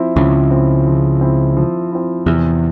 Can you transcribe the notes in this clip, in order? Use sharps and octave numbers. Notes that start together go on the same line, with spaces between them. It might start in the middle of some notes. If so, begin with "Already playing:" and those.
Already playing: F3 C4 E4
C#2 C#3 F3
C4
E4
F3
C4 E4
F3
C4 E4
E2 C3